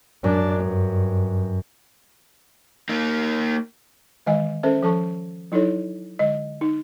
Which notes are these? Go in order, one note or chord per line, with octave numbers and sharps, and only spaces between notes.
F#2 D4
G2
A#3 D#4
D#3 E3 G#3 D#5 G#5
C#4 A4 A#4 C5 E5
F3 A4 A5 C#6
F#3 D#4 E4 A4 C#5
D3 G#3 D#5
D#4